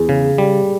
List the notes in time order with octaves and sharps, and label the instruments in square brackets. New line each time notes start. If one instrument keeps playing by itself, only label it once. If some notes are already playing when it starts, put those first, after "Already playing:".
Already playing: [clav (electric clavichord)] E2 [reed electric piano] G#4
[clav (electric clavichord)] C#3
G3